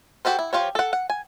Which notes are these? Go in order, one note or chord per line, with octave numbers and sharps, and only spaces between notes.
F#4 G4 A4 C5
E4
F3 F#3 F4 G4 C#5
A4 F#5
F#5
G#5